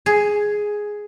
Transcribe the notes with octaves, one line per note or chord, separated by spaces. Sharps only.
G#4